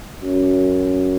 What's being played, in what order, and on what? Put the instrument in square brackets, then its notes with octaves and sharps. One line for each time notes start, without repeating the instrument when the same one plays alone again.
[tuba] F#2